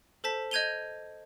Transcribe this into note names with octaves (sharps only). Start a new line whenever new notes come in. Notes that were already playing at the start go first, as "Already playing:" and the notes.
A4 C5 A5 B6
D#5 G6 G#6 D#7 F7 G7